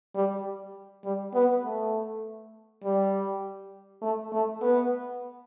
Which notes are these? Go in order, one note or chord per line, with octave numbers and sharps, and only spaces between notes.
G3
G3
B3
A3
G3
A3
A3
B3